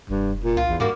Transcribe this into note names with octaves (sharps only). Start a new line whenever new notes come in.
F1 G2
A#2
C2 F4
A1 E2
G#2 G3 A#3 F#4